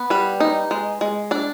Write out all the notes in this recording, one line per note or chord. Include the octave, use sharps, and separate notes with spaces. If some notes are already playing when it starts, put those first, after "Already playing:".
Already playing: B3
G3 B4
D#4
G#3
G#3
D4 D5